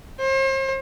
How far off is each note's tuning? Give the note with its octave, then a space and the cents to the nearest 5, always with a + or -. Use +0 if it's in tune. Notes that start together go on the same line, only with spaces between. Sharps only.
C5 +40